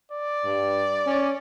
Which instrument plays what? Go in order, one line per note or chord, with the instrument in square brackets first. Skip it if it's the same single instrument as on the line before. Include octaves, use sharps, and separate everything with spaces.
[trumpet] D5
[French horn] G2
C#4